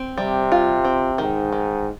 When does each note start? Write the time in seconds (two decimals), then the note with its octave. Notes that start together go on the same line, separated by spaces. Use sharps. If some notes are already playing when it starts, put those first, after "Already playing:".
Already playing: C4
0.18 C3 G3
0.52 F4
0.84 C4
1.18 G#2 D#3
1.52 D#3